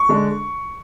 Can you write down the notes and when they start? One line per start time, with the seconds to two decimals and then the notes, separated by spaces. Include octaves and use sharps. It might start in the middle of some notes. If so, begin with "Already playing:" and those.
Already playing: C#6
0.09 D3 G#3 D4